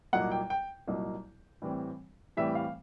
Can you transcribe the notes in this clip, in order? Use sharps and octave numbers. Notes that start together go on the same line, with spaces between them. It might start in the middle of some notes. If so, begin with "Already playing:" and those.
C2 A#2 F#3 A#3 D#4 F#5
G5
G5
C2 A#2 F#3 A#3 D#4
A2 E3 G3 C4
A2 E3 G3 C4 E5
F5